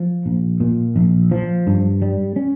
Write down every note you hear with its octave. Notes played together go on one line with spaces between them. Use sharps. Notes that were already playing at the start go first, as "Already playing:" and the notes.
Already playing: F3
A#1
A#2
A#1
F3
G2
G3
C#4